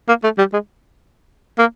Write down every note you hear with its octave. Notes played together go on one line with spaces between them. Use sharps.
A#3
A3
G3
G#3
A#3